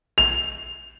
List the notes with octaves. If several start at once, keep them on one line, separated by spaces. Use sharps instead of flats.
F7